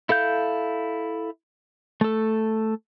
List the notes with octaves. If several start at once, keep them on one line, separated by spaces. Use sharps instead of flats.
E4 A4 F5 G6
A3 A4